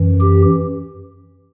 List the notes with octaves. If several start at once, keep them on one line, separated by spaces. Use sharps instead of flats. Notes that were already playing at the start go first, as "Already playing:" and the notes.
Already playing: F#2 E3
G4